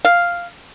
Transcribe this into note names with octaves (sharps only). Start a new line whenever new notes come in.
F5